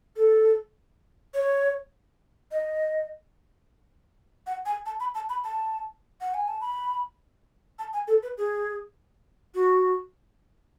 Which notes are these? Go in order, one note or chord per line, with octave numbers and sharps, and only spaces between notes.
A4
C#5
D#5
F#5
G#5
A5
B5
A5
B5
A5
F#5
G#5
A5
B5
A5
G#5
A4
B4
G#4
F#4